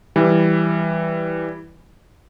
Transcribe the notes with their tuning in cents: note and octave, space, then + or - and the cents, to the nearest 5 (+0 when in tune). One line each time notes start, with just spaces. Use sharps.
E3 +0 G3 +0